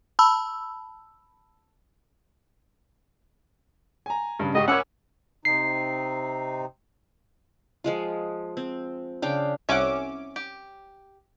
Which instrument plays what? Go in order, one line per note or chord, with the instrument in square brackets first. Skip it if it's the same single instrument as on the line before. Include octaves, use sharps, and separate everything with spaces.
[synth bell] A5 B5 E6
[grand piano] G#5 A#5
G2 C#3
[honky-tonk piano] G#2 C#3 [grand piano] G4 G5 C#6 [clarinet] D#5
[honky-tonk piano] C#4 A#4 C#5 [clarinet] F#5 [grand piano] B5 D6 E6
[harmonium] C3 C4 D#4 [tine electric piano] C7
[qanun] F3 G#3 F4
C4
C#3 D4 F5 G5
[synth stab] C2 C#4 D6 [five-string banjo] E5 F#5
[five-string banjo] G4